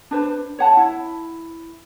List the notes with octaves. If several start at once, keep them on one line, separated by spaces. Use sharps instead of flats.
D4 B4 C5
C#5 F#5 A5
E4